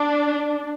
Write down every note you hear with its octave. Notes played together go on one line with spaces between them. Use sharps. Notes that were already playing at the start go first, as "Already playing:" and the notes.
Already playing: D4